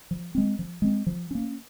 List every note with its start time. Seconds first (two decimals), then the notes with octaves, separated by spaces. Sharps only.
0.11 F3
0.35 G#3 C4
0.59 F3
0.82 G#3 C4
1.07 F3
1.31 A#3 C#4